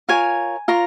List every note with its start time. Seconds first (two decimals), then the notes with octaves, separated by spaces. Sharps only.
0.09 F4 A#4 C#5 G#5
0.68 F4 A#4 C#5 A#5